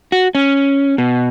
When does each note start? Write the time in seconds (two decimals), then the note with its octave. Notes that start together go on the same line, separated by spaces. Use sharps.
0.12 F#4
0.35 C#4
0.98 B2